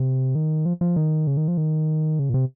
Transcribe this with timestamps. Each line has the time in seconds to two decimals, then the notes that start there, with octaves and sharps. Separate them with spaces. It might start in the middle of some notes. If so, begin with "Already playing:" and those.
Already playing: C3
0.35 D#3
0.66 F3
0.81 F3
0.96 D#3
1.27 C#3
1.37 D#3
1.48 F3
1.57 D#3
2.19 C#3
2.29 A#2
2.34 C3